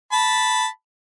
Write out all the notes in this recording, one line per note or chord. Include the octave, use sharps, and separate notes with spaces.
A5 B5